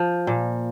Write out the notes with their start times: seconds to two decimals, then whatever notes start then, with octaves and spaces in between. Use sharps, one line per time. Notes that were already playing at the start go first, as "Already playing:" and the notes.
Already playing: F3
0.27 A#2